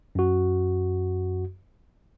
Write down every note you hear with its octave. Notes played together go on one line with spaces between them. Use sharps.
F#2 F#4